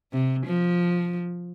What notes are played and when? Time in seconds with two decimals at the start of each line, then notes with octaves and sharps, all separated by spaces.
0.13 C3
0.47 F3